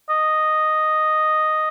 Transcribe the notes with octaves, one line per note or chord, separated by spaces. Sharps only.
D#5